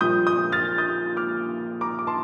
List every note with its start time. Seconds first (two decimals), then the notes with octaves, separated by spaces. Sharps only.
0.01 A#1 A#2 G3 D#6 G6
0.27 D#6 G6
0.52 F6 A6
0.78 D#6 G6
1.17 D6 F6
1.81 A#5 D6
1.99 D6
2.07 A5 C6